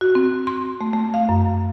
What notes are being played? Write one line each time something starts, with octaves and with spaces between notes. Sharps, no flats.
F#4
C4
C6
A3
A3
F5
F#2